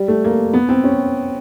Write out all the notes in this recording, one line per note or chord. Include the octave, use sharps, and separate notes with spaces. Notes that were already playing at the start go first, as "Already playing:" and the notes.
Already playing: G3
A3
A#3
B3
C4
C#4